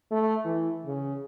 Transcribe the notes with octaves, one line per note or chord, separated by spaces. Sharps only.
A3
E3
C#3